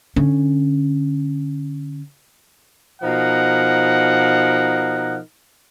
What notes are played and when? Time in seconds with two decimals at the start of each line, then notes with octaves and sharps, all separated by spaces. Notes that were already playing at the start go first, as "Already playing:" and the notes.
0.16 D3 C#4
3.02 B2 F3 D#4 A#4 F#5